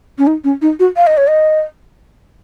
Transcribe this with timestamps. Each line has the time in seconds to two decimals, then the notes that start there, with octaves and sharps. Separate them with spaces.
0.18 C#4
0.27 D#4
0.44 C#4
0.62 D#4
0.79 F#4
0.96 F5
1.07 D#5
1.17 C#5
1.27 D#5